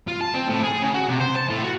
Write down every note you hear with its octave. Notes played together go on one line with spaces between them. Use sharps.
F4
A5
C4
A2
G#4
C#3
F#4
C3
C5
A5
A2
F#4